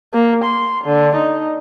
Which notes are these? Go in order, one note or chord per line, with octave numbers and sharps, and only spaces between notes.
A#3
C6
D3
D#4